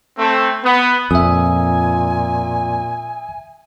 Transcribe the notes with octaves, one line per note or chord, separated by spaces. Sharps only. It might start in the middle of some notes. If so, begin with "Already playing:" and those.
A3 C4
B3
F2 A#2 E5 G#5 D#6